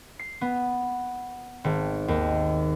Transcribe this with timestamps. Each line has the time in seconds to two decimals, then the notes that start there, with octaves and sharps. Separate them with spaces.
0.19 C7
0.41 B3
1.64 G#1
2.08 D#2